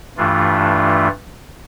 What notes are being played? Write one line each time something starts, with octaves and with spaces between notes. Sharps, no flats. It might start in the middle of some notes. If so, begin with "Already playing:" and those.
G2 E3 A3 D4 F4